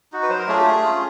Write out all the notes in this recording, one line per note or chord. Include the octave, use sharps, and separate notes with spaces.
D#4 F#4
B4
F#3 C5
A#4
A3 D4 F4 G#4
G4
A3 G#4
C#4 F4